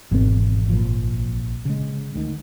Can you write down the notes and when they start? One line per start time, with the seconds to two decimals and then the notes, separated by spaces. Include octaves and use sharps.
0.12 G#1 E2 B2 C4
0.70 A#1 A#2 F3
1.65 C#3 G#3
2.16 D2 D#3